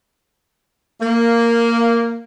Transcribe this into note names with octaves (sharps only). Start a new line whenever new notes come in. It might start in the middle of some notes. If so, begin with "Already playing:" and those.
A#3